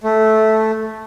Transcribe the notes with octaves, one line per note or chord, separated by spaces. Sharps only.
A3